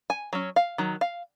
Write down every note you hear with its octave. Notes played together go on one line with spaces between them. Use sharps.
G#5
F#3 C#4
F5
D#3 F#3
F5